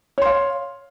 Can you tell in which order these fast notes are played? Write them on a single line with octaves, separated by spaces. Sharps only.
C#5 C6 F5